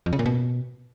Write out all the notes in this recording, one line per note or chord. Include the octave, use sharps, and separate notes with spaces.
F2
C#3
A#2
B2